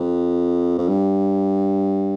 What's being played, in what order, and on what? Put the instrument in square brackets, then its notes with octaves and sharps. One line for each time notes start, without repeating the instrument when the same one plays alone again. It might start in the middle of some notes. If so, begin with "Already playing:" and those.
Already playing: [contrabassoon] F2
F2
G2